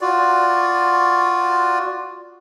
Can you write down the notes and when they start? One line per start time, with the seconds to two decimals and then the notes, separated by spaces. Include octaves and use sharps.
0.01 F4 F#4 D5